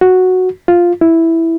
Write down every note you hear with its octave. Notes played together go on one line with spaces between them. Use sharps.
F#4
F4
E4